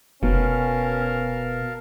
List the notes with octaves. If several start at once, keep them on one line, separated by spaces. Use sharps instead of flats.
F1 B2 C#4 A#4 F5 A5